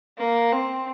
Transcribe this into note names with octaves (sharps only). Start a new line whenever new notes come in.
A#3
C4